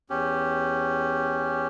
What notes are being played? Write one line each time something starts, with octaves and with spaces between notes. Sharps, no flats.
E2 C#4 G4